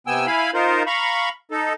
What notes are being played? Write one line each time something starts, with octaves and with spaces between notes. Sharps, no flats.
C3 B3 G5 G#5 E6
E4 F5 G#5 B5
D#4 F4 A#4 C5
F5 A#5 B5 C#6
D#4 A4